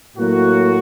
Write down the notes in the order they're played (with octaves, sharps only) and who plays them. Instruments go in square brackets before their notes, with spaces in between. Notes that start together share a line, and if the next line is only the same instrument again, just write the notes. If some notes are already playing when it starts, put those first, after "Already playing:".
[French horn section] A2 F#3 A#3 [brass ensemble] F#4